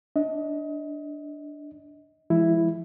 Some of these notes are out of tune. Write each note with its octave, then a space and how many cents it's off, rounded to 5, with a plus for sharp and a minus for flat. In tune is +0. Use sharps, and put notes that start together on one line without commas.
D4 +0 D#5 +30
F3 -40 G#3 +0 E4 +0